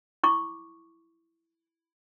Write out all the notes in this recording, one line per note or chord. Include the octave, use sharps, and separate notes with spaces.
E4 C#6 D6